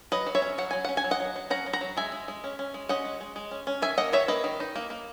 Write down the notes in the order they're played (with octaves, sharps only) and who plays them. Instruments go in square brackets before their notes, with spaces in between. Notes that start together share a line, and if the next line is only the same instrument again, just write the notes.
[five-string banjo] F#3 B4 D#5
F#3
C#5 E5
C#4
F#3 F#5
F#3 G#5
C#4 F#5
G#5
F#3
D#5 F#5
F#3
F#3
C#4 F#5 A#5
F#3
F#5 A#5
F#3
G#3 E5 G#5
G#3
G#3
C#4
C#4
G#3
C#4 D#5 F#5
G#3
G#3
G#3
C#4
C#4
D#3 E5 G#5
A#3 D#5 F#5
D#3 C#5 E5
A#3 B4 D#5
D#3
D#4
A#3
A#3